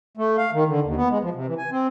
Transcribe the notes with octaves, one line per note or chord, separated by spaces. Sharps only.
A3
F5
D#3
D3
D#2
B3
G#3
F3
C3
E3
G#5
C4